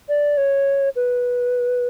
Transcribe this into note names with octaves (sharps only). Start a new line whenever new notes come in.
D5
C#5
B4